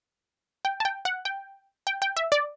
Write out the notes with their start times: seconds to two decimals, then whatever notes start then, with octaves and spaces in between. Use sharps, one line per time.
0.65 G5
0.80 A5
0.85 G5
1.05 F#5
1.25 G5
1.87 G5
2.02 G5
2.17 E5
2.32 D5